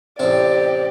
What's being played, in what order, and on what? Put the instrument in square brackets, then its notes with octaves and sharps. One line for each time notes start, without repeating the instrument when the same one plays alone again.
[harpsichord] A1 C3 [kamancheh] G4 D5